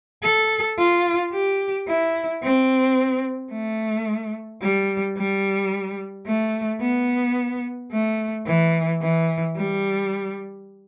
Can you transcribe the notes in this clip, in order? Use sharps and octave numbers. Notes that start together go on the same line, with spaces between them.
A4
F4
G4
E4
C4
A3
G3
G3
A3
B3
A3
E3
E3
G3